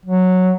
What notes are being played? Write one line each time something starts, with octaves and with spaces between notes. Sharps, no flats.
F#3